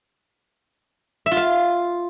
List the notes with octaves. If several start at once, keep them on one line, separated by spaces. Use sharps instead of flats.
E5
F4
F5